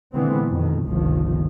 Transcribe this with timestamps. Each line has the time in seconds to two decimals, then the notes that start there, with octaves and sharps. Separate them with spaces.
0.12 A#2 D3 E3 G#3 B3 C4
0.48 F2 B2 D#3
0.86 G1 C#2 C3 D#3 F3